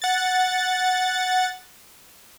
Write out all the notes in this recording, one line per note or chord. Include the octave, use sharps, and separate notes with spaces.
F#5 A6